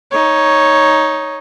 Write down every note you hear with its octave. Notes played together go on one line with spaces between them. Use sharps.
D#4 C#5